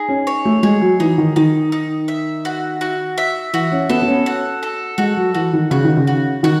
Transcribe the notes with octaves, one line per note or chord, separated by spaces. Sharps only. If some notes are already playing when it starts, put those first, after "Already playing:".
Already playing: D#4 G#4
C#4
C#5
A3
G#3 G#4
F#3
E3 D#4
D#3
D#3 D#4
D#4
E5
F#4
F#4
E5
E3 F#4
C#4
B3 A4
B3
C#4
F#4
A4
G#3 F#4
F#3
E3 F#4
D#3
C#3 F#4
D#3
C#3
F#4
D#3 F#4